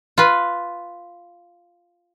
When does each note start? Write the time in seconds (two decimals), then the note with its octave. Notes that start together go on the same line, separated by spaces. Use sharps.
0.18 F4 B4